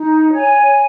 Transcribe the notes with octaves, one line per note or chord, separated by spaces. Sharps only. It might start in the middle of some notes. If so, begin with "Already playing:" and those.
Already playing: D#4
C#5 G#5